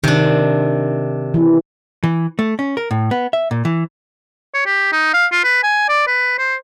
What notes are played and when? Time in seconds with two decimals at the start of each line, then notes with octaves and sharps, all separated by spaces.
0.04 C3 D#3 D4
1.34 E3
2.04 E3
2.39 A3
2.59 C#4
2.77 A#4
2.91 A2
3.11 B3
3.33 E5
3.51 A#2
3.65 E3
4.54 C#5
4.66 G4
4.92 D#4
5.14 F5
5.32 F4
5.44 B4
5.64 G#5
5.89 D5
6.07 B4
6.38 C5